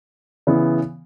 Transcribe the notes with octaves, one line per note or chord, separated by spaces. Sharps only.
C#3 E3 B3